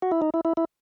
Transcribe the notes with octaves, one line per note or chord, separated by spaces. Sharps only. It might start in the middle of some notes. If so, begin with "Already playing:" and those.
F#4
E4
D#4
E4
E4
E4